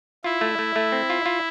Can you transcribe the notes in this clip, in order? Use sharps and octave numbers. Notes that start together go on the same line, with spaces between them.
E4 F4
A3
A3
A3
C4
F4
F4